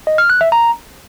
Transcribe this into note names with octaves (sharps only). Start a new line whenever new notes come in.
D#5
F6
F#6
E5
A#5